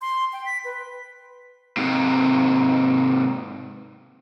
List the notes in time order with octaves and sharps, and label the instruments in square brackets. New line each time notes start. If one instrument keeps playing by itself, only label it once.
[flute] C6
G5
B6
B4
[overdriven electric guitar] G#2 C3